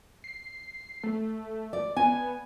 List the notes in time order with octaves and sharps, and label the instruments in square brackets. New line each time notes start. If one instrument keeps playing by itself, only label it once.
[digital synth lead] C7
A3
[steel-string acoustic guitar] D5
[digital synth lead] B3 [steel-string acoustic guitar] G#5